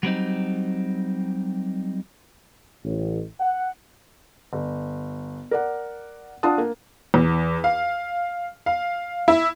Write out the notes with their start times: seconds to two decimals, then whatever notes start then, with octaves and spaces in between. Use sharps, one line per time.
0.03 F#3 G3 C4 D#4
2.84 A1
3.40 F#5
4.53 G1
5.51 A#4 D5 F#5
6.43 D4 F4 F#5 A5 D#6
6.58 A#3
7.14 E2
7.64 F5
8.66 F5
9.28 E4